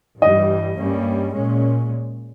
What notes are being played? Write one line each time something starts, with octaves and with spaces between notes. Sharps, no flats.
G2 E3 G3 D#5
G2 G3 A#3 C#4
A#2 G#3 C#4